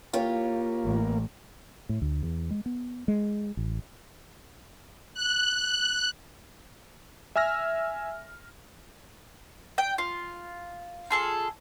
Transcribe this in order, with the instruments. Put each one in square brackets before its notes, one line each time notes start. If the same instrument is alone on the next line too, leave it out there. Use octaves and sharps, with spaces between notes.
[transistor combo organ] A#3 [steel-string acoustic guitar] F4 G4 C#5
[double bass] A1
[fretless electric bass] A2
D2
E2
G#3
B3
G#3
A1
[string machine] F#6
[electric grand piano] E5 G#5 E6 F6 A#6
[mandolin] G5
F4
F4 G#4 A4